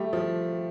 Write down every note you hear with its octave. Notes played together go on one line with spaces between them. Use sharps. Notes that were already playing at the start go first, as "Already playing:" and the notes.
Already playing: G3 A3
F3